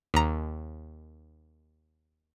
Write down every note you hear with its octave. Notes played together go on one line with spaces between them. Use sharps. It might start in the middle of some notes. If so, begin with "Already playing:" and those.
D#2 A#5